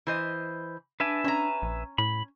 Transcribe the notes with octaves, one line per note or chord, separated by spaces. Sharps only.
E3 C5 D#5
D4 B4 E5 G#5
C#4 D4 A#5
A#1
A2 B5